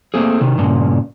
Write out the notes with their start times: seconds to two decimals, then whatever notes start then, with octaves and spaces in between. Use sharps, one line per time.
0.14 A3 A#3 C4 G#4
0.41 C3 D#3
0.58 G2 A#2 C#3